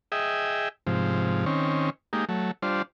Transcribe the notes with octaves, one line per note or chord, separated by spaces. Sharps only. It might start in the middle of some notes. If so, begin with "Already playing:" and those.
G#4 D#5 E5 G5
G#2 C3 F3
D#3 C4 C#4
G#3 A#3 D#4 G4
F#3 A3
G3 D4 F4 C5